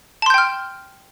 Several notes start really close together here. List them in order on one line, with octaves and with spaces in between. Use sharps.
A5 C6 G6 G5 F6